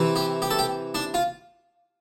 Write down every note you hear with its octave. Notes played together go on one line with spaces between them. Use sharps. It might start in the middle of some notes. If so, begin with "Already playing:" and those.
Already playing: C3 E3
G4
G4
A4
G4
D4
F4